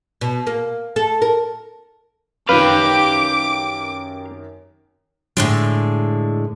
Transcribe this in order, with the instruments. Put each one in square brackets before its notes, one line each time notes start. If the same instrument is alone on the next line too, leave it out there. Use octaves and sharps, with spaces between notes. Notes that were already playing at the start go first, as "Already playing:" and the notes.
[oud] B2
A#3
A4
A#4
[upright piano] F#2 D#3 [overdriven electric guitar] G4 F5 [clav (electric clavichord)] B4 [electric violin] D6
[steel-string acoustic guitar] A2 D3 G#3